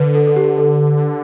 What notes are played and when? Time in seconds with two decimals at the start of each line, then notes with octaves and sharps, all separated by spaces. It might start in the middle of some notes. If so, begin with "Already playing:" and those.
Already playing: D3 B4 C5
0.15 A4
0.27 A4
0.36 G4
0.58 A4